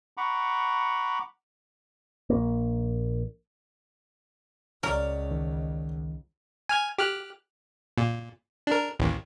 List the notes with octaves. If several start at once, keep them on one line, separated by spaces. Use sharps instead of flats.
F#5 A#5 B5 C#6 D6
A#1 A#3
C#2 A#4 C#5 D5
A1 D#3
G#5 F6 G#6
G4 F6 F#6
A#2
D4 A#4
A1 D#2